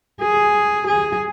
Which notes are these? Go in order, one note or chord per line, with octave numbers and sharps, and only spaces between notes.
G#4
G#4